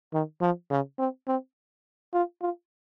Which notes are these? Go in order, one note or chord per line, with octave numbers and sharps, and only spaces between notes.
D#3
F3
C#3
C4
C4
F4
F4